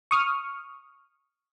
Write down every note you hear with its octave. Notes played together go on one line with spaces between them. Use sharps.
C#6 D#6 F6